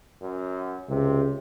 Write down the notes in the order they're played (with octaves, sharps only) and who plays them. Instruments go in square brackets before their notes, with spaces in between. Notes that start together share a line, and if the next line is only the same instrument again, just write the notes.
[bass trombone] F#2
[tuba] C#2 [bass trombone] C3